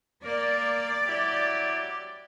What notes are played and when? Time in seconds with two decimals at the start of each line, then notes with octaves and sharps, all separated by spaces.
0.24 A#3 D5
1.06 F#3 E4 G4